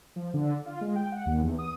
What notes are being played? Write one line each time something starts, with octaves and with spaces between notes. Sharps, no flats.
F3
D3
F4
G#3
G5
F#5
D#2
E2
D#6